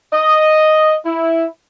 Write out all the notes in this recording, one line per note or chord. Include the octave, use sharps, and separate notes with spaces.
D#5
E4